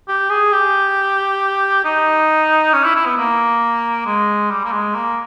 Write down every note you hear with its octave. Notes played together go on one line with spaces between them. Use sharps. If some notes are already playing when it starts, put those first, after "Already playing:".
G4
G#4
G4
D#4
C#4
E4
E4
B3
A#3
G#3
G3
A#3
G#3
A#3